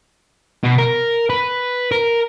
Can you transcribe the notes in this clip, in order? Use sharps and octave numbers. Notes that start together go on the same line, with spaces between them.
B2
A#4
B4
A#4